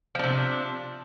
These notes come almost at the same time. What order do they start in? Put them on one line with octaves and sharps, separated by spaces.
F3 D4 C3